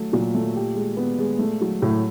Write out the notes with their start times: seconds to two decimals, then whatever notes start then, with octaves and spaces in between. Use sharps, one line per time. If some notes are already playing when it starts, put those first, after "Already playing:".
Already playing: F#3 A3
0.13 A#2 F#3
0.34 A3
0.56 G4
0.76 G#3
0.97 B3
1.19 G#3
1.39 A3
1.61 F#3
1.82 A2 F#3